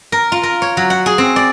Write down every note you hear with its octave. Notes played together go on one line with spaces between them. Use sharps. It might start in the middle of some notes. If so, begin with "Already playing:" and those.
A#4
F4
A#4
C#5
F#3
F#5
G#4
C4
D5